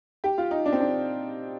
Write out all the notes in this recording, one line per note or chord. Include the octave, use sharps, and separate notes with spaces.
G4
F4
D#4
D4
C4
D4